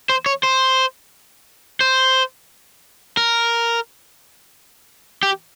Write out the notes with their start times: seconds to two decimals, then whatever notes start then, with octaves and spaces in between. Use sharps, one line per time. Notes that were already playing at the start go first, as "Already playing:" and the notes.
0.09 C5
0.26 C#5
0.43 C5
1.81 C5
3.17 A#4
5.23 G4